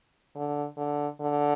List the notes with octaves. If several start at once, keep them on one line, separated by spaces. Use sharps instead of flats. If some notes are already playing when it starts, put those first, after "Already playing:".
D3
D3
D3